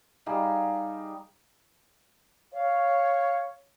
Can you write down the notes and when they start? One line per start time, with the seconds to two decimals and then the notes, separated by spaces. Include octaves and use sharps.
0.26 G3 D#4 G#4 F5
2.54 C#5 F5